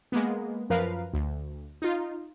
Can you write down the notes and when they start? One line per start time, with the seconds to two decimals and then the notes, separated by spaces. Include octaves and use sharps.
0.12 G#3 A#3 B3
0.70 F#2 F3 A#4 B4 F5
1.13 D2
1.82 D#4 F4